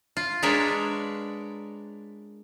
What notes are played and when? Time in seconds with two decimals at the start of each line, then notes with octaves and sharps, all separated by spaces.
0.17 F4
0.43 G#3 D4 A#4 B4 C#5